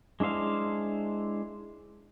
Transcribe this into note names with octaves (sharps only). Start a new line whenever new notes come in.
G#3 D4 E4 C5 F5